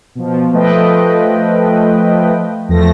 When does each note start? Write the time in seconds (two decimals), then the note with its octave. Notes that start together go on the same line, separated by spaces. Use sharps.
0.15 B2 F3
0.53 F3 A3 B4 D#5 G5
2.69 E2 F3 A3 A#6